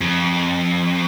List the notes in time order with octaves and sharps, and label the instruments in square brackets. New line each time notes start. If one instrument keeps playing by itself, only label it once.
[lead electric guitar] F2